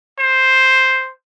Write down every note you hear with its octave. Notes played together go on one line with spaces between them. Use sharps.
C5